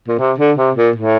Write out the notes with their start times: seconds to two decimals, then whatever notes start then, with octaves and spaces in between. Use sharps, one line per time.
0.08 A#2
0.19 C3
0.38 D3
0.57 C3
0.77 A#2
0.96 A2